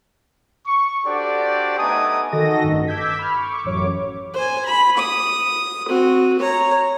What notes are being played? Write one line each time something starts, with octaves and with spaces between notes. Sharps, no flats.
C#6
D4 F#4 G4 A4 C5 D5
A3 B3 D#4 G#5 A#5 D#6
D#3 F#4 A4 D#5 A#6
A1 G2
D6 E6 G6 G#6 B6
B5 F6
C#6 D6
A1 F#2 C#5 D6
C5 G#5
B5
D#6
C4 F#4
C#5 A#5